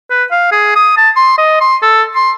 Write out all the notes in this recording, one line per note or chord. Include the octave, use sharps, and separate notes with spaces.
B4
F5
G#4
D#6
A5
C6
D#5
C6
A4
C6